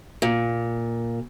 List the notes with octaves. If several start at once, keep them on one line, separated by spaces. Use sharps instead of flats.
A#2